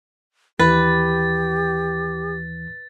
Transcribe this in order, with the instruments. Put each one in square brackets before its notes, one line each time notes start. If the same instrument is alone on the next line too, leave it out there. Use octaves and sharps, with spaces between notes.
[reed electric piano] D#2 E3 [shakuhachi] G4 [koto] B4 [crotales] A6